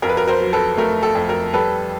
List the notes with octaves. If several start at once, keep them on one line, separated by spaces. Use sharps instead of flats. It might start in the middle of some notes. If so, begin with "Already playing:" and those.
F2 A#4
B4
A#4
A#4 C5
F#3
A4 B4
A3 A#4
A4
F2
A#4
G3 A4 B4